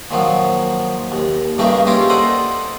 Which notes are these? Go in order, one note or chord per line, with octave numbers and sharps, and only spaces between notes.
A#2 D#3 F3 F#3
D#2
G2 C#3 A3 A#3 D#4 G4
A#3 C#4 E4 F4 G4 A#4
A4 C5 D5 D#5 F#5